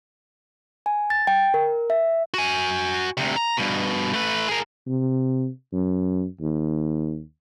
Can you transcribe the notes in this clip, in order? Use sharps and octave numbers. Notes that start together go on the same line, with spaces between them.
G#5
A6
G5
A#4
E5
F#4 G#5
D2 C3
A#5
G2 B2
A3 B4
G#4 A#4
C3
F#2
D#2